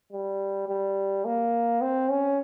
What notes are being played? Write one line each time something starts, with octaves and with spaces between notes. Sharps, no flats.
G3
G3
A#3
C4
C#4